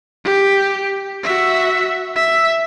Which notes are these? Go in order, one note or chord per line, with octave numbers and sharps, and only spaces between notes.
G4
F#4 E5
E5